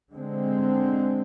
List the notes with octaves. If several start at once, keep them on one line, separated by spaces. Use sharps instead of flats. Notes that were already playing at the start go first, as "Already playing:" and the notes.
D3 G#3 C4